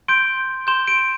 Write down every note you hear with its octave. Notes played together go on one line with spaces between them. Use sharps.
C6 G6 D7
C6 G6 E7
D7